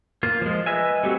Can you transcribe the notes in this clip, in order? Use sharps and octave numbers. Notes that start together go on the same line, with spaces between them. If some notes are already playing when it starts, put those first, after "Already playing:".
A#3 F4
F3 G#3
B4 D#5 E5 G#5
G3 A3 C4 F#4 G4